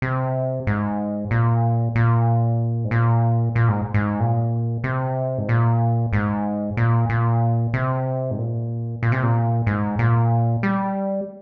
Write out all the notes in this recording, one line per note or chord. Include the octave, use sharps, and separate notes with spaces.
C3
G#2
A#2
A#2
G#2
A#2
A#2
G#2
G#2
A#2
C3
G#2
A#2
G#2
A#2
A#2
C3
G#2
A#2
A#2
C3
A#2
G#2
A#2
G3